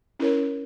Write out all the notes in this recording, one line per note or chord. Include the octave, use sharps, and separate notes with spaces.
C#4 E4 A#4 C#5